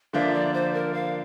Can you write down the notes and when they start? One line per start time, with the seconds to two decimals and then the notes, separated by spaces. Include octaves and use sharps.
0.13 D3 F3 A#3 D4 E5
0.34 D5
0.54 C5
0.74 A#4
0.94 F5